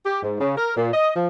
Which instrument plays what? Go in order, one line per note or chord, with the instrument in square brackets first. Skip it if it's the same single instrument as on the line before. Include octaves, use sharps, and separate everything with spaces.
[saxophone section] G4
G#2
C#3
A#4
A#2
D#5
F3